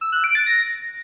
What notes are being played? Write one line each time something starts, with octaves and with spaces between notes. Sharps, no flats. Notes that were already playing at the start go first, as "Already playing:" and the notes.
E6
F#6
D7
A6
A#6